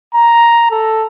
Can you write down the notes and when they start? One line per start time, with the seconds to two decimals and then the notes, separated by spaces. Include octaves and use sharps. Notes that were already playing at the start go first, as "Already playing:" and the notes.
0.15 A#5
0.71 A4